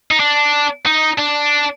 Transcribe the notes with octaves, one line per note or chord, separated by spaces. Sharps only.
D#4
D4
D#4
D4